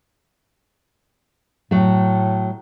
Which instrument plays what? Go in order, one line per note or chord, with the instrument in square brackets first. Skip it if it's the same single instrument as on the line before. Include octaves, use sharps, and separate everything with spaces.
[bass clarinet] A2 [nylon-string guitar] F#3 A3